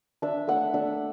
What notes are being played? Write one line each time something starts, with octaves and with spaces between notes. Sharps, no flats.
D4 E5
A3 F#5
D4 E5